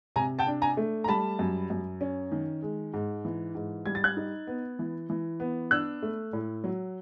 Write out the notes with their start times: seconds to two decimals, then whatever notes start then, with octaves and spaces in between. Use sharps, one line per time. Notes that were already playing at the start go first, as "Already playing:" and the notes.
0.16 C3 G#5 A#5
0.39 G5 A5
0.47 D4
0.62 G#5 A#5
0.77 A3
1.04 A#5
1.08 G3 A5 B5
1.39 F#2
1.70 F#2
2.01 C#4
2.32 D#3
2.62 G#3
2.93 G#2
3.25 E3
3.55 G#2
3.86 G3 G#6
3.95 A6
4.04 F#6 G#6
4.17 D#4
4.47 B3
4.79 E3
5.10 E3
5.40 B3
5.71 D4 E6 F#6
6.02 A3
6.33 A2
6.64 F#3